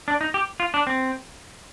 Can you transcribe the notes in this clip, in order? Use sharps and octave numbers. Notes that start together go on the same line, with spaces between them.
D4
D#4
G4
F4
D4
C4